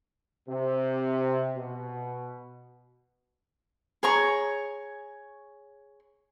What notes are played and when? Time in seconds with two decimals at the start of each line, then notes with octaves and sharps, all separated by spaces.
0.48 C3
1.57 B2
4.03 G#4 C#5 A#5 C#6